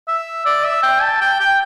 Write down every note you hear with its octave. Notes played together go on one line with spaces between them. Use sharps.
E5
D5
E5
G5
A5
G5
G5